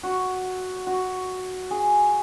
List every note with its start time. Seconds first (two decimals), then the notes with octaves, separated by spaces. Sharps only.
0.03 F#4
0.87 F#4
1.71 G#4